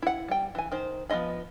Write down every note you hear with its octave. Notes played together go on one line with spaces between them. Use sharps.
E4 F#5
G3 G5
E3 G#5
D#3 C5
F3 B3 F4 D#5 B5